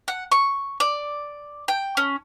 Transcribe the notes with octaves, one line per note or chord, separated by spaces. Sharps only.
F#5
C#6
D5
G5
C#4